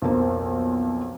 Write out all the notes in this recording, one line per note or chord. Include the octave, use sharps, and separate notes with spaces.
B1 F2 A#3 C5